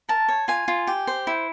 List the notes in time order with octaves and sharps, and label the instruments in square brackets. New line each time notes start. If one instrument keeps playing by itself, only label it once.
[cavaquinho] A#4 A5
C#5
F4 G#5
F4
G4
C5
E4